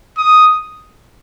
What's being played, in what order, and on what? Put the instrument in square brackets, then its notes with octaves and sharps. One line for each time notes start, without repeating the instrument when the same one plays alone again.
[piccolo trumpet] D#6